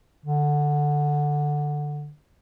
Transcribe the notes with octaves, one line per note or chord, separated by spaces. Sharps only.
D3